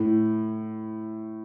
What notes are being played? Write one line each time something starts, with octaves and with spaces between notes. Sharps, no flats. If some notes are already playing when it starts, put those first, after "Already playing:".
Already playing: A2